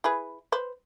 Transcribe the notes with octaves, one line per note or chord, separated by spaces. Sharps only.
E4 G#4 B4
B4 C5